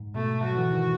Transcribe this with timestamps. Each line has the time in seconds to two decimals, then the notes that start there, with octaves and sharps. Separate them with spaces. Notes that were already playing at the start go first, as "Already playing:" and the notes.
Already playing: G#2
0.15 B2 A3
0.43 F#3 F#4
0.57 E3
0.71 D#3